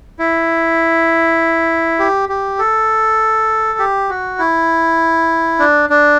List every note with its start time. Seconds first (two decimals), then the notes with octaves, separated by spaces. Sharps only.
0.19 E4
1.99 G4
2.29 G4
2.59 A4
3.79 G4
4.10 F#4
4.39 E4
5.59 D4
5.90 D4